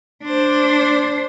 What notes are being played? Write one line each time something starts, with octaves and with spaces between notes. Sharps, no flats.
D4 C5